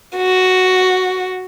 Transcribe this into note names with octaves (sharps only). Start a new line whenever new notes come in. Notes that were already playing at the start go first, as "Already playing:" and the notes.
F#4